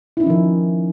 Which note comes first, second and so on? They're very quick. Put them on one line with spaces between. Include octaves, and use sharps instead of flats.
E4 D#4 C#4 F3 D#3